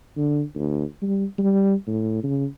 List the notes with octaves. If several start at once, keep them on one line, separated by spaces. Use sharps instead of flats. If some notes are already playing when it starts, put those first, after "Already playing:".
D3
D2
G3
G3
A2
C#3